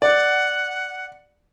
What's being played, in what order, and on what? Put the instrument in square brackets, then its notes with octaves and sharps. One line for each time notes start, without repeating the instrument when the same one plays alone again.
[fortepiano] D5 [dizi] F#5